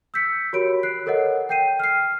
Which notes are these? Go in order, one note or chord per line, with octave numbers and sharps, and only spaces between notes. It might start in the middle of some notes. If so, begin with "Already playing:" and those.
E6 G6 B6 C#7
F#4 G4 A#4 C#5 B5 D7
F#6 C7
A4 A#4 C#5 D#5 F#5
G5 G6 C7 D#7
F6 C7